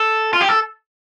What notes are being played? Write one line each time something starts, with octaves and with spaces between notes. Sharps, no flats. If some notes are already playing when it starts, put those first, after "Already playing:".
Already playing: A4
F4
G4
A4